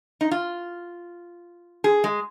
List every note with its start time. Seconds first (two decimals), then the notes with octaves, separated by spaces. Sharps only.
0.21 D#4
0.31 F4
1.84 G#4
2.04 G#3